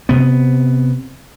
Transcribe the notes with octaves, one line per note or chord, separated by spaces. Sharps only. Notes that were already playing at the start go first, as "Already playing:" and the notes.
C3 B3